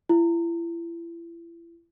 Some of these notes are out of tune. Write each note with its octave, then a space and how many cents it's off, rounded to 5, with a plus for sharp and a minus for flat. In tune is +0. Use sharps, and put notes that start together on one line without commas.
E4 +35